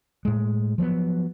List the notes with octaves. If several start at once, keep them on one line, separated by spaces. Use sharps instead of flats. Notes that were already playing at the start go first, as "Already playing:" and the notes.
A2 G#3
F3 F#3 A3 B3